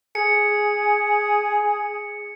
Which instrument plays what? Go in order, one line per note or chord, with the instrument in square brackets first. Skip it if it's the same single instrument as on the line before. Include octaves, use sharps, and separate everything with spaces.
[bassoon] G#4 [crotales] C#7